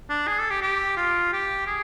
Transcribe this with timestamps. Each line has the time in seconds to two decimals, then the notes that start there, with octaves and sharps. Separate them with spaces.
0.10 D4
0.28 G#4
0.40 A4
0.51 G4
0.62 G4
0.97 F4
1.33 G4
1.67 G#4